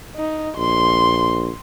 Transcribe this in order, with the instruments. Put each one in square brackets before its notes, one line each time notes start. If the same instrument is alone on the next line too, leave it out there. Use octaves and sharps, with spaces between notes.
[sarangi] D#4
[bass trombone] A#1 [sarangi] C6